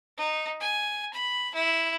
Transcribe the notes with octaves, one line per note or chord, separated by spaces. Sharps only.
D#4
G#5
B5
E4